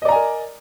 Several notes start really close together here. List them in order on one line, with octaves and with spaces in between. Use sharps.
D#5 D5 A#5 G#5 A#4